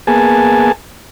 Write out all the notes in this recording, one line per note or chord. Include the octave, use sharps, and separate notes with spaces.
A#3 B3 G#4 G#5 A5